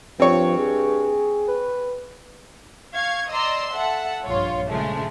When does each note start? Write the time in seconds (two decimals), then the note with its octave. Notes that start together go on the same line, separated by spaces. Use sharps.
0.20 G2 F3 C4 C#5
0.58 G#4
1.48 B4
2.94 F5 C#6 G#6
3.29 D5 D#5 A#5 C6 E6
3.72 A4 E5 F#5
4.24 A#1 G2 F4 C#5
4.69 G2 C#3 F3 G#3 A3